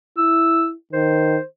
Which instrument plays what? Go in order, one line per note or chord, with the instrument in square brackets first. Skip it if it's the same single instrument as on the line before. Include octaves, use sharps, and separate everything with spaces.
[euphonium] E4 [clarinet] E6
[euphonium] D#3 [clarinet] C5